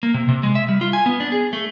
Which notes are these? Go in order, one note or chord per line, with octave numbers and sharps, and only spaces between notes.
A#3
C3
C3
G#3
E5
G3
F4
G#5
B3
D4
G#4
A3